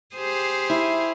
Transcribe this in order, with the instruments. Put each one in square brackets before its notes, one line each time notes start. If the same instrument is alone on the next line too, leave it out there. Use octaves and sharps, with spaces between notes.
[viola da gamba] G4 G#4 C5
[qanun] E4